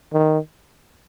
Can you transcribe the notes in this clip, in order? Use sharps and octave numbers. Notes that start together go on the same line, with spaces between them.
D#3